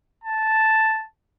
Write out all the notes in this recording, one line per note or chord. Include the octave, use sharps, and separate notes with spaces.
A5